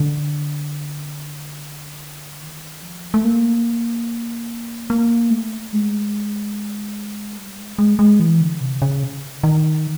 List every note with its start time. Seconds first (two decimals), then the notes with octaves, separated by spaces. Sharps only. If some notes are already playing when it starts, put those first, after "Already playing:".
Already playing: D3
2.42 D#3
2.82 F3
3.14 A3
3.25 A#3
4.90 A#3
5.30 A3
5.73 G#3
7.37 G3
7.58 G#3
7.78 G#3
7.99 G#3
8.20 E3
8.41 D3
8.61 C3
8.82 C#3
9.43 D#3